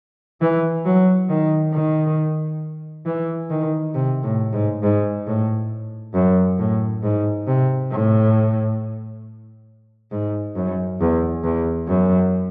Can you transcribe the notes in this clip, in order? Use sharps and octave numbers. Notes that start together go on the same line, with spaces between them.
E3
F#3
D#3
D#3
E3
D#3
C3
A2
G#2
G#2
A2
F#2
A2
G#2
C3
A2
G#2
F#2
E2
E2
F#2